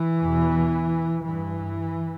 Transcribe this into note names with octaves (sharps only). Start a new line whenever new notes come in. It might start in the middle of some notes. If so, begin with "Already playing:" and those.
Already playing: E3
E2 B2
G2 E3